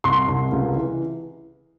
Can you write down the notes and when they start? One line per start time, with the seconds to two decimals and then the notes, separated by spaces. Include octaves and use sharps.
0.04 C2 C6
0.28 C2
0.52 C#2
0.76 E3